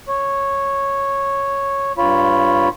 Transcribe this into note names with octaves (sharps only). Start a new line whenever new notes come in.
C#5
G2 F4 C#5 B5